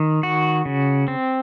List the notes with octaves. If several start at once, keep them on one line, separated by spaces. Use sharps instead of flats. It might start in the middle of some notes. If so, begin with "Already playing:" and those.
Already playing: D#3
F#4
C#3
C4